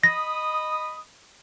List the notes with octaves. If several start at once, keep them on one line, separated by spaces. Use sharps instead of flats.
D#5 B5 D#6 A#6